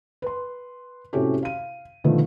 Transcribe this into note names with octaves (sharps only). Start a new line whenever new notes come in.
B4 C6
A2 C3 C#4 F#4 G4 A4
F5 D#7
B2 D3 D#3 F3 A3